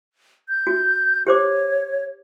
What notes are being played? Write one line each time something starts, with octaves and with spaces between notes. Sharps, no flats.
G6
F#4
G4 C5 C#5 D6